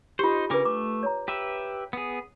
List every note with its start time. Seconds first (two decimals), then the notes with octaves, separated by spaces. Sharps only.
0.19 D#4 F4 G4 C5
0.50 C#3 D4 A#4 B4 D6
0.65 A3 D6
1.03 C#5 A#5
1.28 G4 B4 E5
1.93 B3 G#4